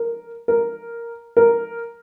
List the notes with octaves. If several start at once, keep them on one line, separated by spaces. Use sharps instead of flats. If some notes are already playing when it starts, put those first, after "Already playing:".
Already playing: A#4
A#4
A#4